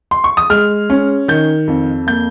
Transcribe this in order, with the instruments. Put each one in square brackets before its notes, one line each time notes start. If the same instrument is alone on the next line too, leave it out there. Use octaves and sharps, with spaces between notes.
[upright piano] C6
C#6
D#6
G#3 F6
C#4
D#3 G6
F2
A#3 G6